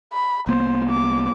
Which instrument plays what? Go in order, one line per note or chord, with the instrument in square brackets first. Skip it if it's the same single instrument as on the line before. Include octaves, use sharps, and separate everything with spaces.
[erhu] B5
[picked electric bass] C2 A#3 B3 [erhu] C5
[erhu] D6